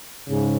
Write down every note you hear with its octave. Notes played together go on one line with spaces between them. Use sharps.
G#2 C#3